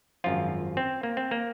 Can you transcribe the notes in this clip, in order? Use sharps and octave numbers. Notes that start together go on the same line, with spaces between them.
G#1 F#2 F3 F4
C4
A#3
C4
A#3